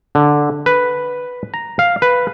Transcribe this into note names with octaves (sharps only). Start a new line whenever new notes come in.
D3
B4
A#5
F5
B4